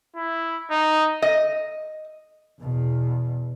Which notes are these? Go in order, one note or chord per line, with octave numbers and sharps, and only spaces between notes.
E4
D#4
D#5
E2 B2